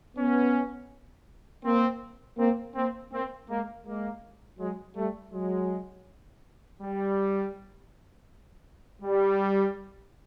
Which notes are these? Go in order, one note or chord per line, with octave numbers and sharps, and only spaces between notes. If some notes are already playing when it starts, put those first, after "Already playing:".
B3 C#4
A#3 C4
A#3 C4
A#3 C4
A#3 C4
G#3 A#3
G#3 A#3
F#3 G#3
G3 A3
F#3 G#3
G3
G3